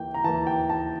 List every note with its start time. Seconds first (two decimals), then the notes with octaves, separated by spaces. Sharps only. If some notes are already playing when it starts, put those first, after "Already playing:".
Already playing: E3 A#3 G5
0.14 A#5
0.24 E3 A#3 A5
0.47 G5
0.70 A5